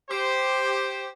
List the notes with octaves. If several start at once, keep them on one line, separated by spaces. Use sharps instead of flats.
G4 C5